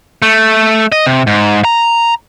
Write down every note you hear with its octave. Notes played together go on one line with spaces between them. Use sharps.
A3
D#5
C3
G#2
A#5